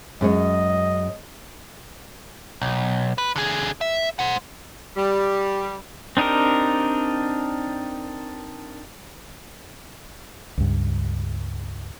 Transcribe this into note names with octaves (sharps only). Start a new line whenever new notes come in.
F#2 G#3 C#4 D#5
B1
B4
D3 G#4
E5
C5 F#5
G3
C4 D4 D#4 G4 A#4
C#2 G2